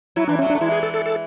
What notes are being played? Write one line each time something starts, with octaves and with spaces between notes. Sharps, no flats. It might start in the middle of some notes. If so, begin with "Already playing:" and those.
F#3 E4
E3 D4
D3 F#3 C#4
D4
A3
E3 G#3 E4
G#4
A4
A4
A4